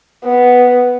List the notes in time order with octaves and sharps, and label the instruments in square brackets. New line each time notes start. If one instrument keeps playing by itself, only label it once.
[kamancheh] B3